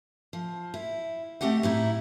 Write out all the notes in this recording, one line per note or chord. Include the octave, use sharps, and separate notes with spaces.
F3
E4
A3 C4 G4 D#5 F#5
A2 D#4 E4